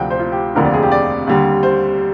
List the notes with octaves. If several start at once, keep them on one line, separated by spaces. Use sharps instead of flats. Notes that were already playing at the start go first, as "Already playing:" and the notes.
Already playing: D2 C3 F3 G5
C5
F4
G4
F1 D#2 D3 F3 A#4
D5
G#4
G4
D5
D#2 D3 G3
C5